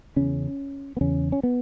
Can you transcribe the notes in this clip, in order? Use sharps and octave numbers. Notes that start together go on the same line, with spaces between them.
E2 C#3 C#4
B3
E2 C#3 C#4
C#4
B3